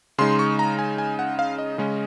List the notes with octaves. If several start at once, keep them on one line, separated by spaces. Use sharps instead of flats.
C#3 G#3 D#4 C6
C#6
A#5
G#5
G#5
F#5
F5
D#5
C#3 G#3 C#4